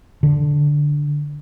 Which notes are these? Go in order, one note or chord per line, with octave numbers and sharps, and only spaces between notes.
D3